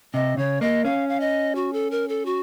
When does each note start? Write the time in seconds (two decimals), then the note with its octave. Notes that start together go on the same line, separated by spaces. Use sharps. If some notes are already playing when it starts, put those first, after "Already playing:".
0.14 C3 D#5
0.37 C#3 C#5
0.61 A#3 D#5
0.85 C#4 F5
1.09 F5
1.20 D#5
1.55 F#4
1.73 A4
1.91 A#4
2.08 A4
2.26 F#4